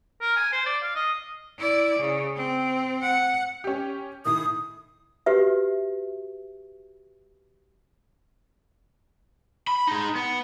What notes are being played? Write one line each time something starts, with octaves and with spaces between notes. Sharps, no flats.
A#4
G#5
C5
D5
F5
D#5
E4 D5
C#3
C4
F#5
C#4 G4
A2 D#3 D#6
F#4 G4 B4 E5
B5
D#4 G#4
B3